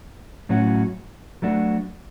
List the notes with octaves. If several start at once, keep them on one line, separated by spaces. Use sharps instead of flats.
A2 F#3 C#4 F#4
F#3 A3 D4 F#4